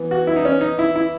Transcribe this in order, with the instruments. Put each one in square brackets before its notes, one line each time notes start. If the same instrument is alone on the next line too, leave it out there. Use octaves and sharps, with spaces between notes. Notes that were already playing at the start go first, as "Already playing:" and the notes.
Already playing: [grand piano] E3 B3
[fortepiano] F#4
E4
D#4
C#4
D#4
E4
E4